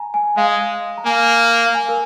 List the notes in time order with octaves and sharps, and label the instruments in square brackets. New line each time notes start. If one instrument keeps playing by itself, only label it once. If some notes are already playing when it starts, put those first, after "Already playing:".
Already playing: [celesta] G#5 A#5
G#5
[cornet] G#3 [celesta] F5
[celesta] A#5
[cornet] A#3 [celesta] G#5
[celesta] F5
G#5
A#4